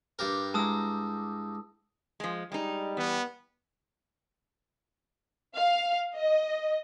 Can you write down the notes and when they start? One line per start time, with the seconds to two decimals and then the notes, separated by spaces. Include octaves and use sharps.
0.19 G2 G4 A#4
0.54 G#3 E4 A5 A#5 D#6 E6
2.20 F3 G#3
2.52 G3 G#3 D#4
2.97 E3 B3
5.56 F5
6.15 D#5